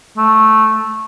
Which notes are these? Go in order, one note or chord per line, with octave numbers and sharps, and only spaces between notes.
A3